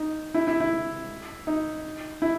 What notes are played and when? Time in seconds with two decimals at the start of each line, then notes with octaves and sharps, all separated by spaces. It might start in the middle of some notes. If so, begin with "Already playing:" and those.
Already playing: D#4
0.34 E4
0.47 E4
0.60 E4
1.47 D#4
2.22 E4